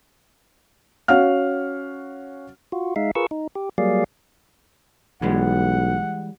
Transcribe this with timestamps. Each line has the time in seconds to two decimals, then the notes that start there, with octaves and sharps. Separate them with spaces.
1.08 C#4 F#4 F5 F#5 F6
2.72 F4 F#4
2.96 G#3 D#4 E5 F5
3.15 F4 G#4 A#4 B4 C#6 E6
3.31 D#4
3.55 G4
3.78 F#3 G3 A#3 G#4 D5 F5
5.22 B1 E3 G3 G#3 F#5